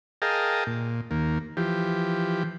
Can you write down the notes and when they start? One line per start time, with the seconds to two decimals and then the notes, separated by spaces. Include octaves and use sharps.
0.22 G#4 A#4 D#5 F5 G5 A5
0.67 A#2
1.11 D#2 A#3
1.57 E3 F3 G4